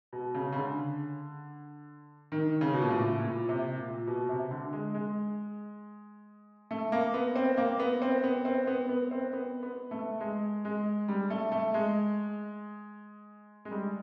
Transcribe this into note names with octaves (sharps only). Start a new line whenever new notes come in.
B2
C#3
C#3
D3
D#3
C#3
B2
A#2
A2
A#2
C3
A#2
B2
C3
D3
G#3
G#3
A3
A#3
B3
C4
A#3
B3
C4
B3
C4
B3
B3
C4
B3
B3
A3
G#3
G#3
G3
A3
A3
G#3
G#3
G3